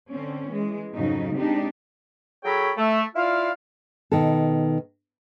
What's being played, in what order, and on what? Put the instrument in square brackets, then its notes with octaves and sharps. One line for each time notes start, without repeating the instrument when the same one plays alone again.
[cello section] D3 C4 C#4
E3 G#3
F2 G#2 C#3 F#3 D#4
G#3 C4 D4 D#4 G4
[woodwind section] F#3 G#4 A4 C#5 G5 B5
A3
E4 F4 D5 F5
[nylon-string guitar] B2 D#3 A4